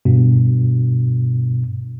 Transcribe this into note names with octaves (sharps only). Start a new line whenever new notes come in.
G2 B2